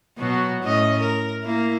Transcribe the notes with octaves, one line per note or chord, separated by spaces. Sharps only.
B2 F#3 F#4
A2 C#4 D#5
A#4
A#3 E4